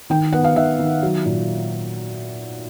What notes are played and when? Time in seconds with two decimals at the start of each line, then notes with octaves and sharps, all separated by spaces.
0.10 D#3 G5
0.33 B3 F#5
0.44 F5
0.56 D#3 E5
0.79 D#3
1.03 F#3
1.25 A#2